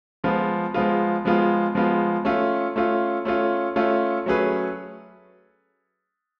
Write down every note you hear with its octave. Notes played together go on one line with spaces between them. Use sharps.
F3 G#3 B3 F4
F3 G#3 B3 F4
F3 G#3 B3 F4
F3 G#3 B3 F4
A3 C#4 F4
A3 C#4 F4
A3 C#4 F4
A3 C#4 F4
F#3 A3 C#4 G#4 B4